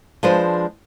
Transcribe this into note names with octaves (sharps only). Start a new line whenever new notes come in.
F3 G#3 D4 B4 C5